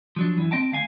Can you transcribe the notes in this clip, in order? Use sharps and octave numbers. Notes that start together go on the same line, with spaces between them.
F3 F#3 D4
F#2 E3
C4 D#5 G5 A5
D2 F5 G#5